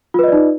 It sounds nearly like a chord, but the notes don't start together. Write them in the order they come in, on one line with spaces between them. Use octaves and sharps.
F4 B4 D#5 D5 D#4